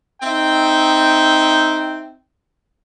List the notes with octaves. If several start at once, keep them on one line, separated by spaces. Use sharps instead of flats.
C4 D#4 E5 G5